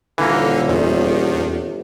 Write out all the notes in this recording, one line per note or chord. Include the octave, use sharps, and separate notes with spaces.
D#1 D3 E3 A#3
G1 E2